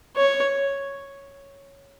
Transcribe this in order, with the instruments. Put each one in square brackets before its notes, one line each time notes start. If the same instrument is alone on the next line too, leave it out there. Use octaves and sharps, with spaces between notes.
[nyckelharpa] C#5